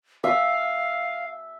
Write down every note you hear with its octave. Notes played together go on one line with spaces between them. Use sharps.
E5 F5